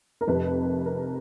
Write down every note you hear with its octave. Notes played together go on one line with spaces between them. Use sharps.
A#4
F1 F2 C3 B4
A#4